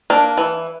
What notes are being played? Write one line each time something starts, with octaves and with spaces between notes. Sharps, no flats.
A#3 D4
E3